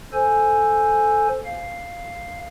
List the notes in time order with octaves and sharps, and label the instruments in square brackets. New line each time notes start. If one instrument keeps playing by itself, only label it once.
[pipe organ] A4 C5 G#5
F5